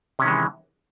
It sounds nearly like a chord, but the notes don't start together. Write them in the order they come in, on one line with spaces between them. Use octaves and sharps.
C3 C#4 D#3 G#3 E3